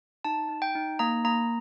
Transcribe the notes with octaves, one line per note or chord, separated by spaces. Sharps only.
D#4 A5
D#4
G5
D#4
A#3 A#5
A#3 A#5